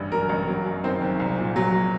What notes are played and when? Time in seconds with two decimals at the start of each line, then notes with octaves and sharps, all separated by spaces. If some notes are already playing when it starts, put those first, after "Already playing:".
Already playing: A1 G2
0.12 F#3 A#4
0.29 A1
0.47 F#3
0.65 F#2
0.84 D#3 C4 C5
1.01 F#1
1.20 C2
1.38 A#2
1.56 F#3